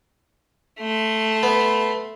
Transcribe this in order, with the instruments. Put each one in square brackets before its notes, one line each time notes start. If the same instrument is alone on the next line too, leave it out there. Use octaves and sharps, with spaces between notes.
[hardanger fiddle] A3 C6
[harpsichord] B3